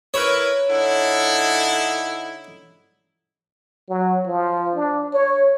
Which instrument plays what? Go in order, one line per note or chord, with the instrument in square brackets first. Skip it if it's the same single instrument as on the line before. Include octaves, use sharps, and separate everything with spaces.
[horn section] E4 A#4 B4 [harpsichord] C#5
[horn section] D3 D#4 E4
[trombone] F#3
F3
D4
C#5